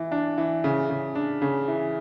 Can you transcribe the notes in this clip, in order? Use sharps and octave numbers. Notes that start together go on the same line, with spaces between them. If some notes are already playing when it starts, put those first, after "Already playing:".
Already playing: E3
D4
E3
C#3
C#3
D4
C#3
E3